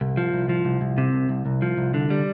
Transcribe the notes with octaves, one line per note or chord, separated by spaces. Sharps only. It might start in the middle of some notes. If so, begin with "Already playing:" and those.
C2
F3
C2
F3
C2
C2
C3
C2
C2
C2
F3
C2
D3
G3